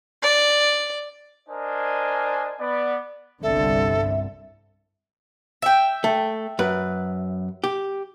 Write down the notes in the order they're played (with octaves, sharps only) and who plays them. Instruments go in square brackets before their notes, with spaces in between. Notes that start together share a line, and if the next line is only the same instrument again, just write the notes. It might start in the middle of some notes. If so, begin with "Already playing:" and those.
[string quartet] D5
[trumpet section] D4 A#4 C5 D#5 G#5
B3 D5
[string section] G1 C2 D3 [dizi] A4 [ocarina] E5
[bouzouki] E5 G5
[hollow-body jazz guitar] A3
F#2 B4
G4